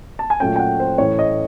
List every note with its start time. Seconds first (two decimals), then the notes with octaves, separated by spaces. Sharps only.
0.19 A5
0.30 G#5
0.40 A#2 F#3 A3 C#4 G5
0.56 G5
0.59 F#5
0.80 C5
0.98 A2 E3 A3 C#4 C#5
1.19 D#5